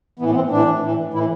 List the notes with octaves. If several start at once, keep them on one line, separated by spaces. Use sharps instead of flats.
A2 E3 B3
B3
C4
A2 E3 D4
A2 E3
A2 E3 E4